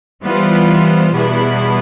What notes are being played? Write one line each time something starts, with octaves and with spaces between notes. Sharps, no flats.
E3 G3 B3 F4 C5
E2 B2 G3 B3 E4